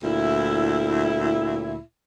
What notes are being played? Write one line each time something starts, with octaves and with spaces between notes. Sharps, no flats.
D2 A#2 E4